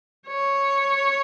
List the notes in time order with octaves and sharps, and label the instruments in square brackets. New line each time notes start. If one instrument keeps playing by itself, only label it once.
[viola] C#5